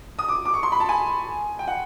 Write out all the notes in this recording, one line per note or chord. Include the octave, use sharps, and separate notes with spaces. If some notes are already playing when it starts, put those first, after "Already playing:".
D#6
D6
D6
C#6
C6
B5
A5
G#5
G5
F#5